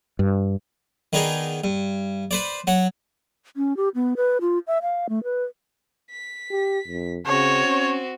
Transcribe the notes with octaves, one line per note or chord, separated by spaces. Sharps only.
G2
D#3 B3 D4 D#4 G#4
G2
B4 C5 D5
F#3 F#5
C#4
G4
B3
B4
F4
E5
F5
A3
B4
B6
G4
F2
C#3 C4 F#4 C#5
C#4